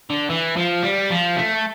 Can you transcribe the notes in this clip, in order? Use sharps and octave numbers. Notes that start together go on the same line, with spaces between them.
D3
E3
F3
G3
F3
A3